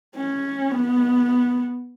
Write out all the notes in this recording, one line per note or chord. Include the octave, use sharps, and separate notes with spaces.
C#4
B3